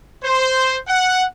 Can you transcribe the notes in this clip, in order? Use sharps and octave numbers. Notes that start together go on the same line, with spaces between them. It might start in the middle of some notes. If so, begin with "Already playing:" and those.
C5
F#5